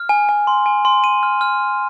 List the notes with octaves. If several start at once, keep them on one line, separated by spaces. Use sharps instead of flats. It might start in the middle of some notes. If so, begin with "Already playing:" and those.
Already playing: F6
G#5
G#5
C6
G#5
C6
D#7
F6
F6